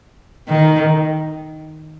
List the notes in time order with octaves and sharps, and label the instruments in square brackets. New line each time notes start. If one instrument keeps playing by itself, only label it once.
[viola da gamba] D#3